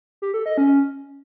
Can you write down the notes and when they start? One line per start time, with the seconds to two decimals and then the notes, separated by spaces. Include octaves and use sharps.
0.22 G4
0.34 A4
0.46 D#5
0.58 C#4